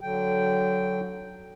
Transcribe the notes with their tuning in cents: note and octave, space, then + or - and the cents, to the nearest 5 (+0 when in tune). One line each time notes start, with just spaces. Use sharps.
D3 -5 F#3 +5 G5 +0